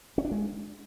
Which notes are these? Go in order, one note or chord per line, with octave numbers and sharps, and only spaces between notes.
C#4
D4
G#3